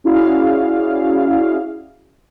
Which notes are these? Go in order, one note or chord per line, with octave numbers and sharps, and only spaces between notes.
C#4 E4 F#4 G#4 D5 F5